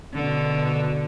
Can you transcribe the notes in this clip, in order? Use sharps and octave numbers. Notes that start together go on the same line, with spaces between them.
B2 D3